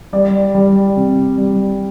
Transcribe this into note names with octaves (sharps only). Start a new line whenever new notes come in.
G3 D5
G3
C3
G3